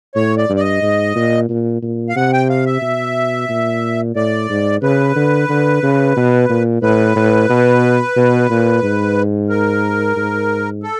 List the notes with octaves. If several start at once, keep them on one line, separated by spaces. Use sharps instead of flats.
A2 C#5
D5
G2
D5
D#5
G#2
A#2
A#2
A#2
F5
C3 F#5
G5
F5
E5
B2
A#2
A2 D5
G#2
C#3 B4
D3
D3
C#3
B2
A#2
A2 B4
A2
B2
B2
A#2
G#2
A#4
G#2
A4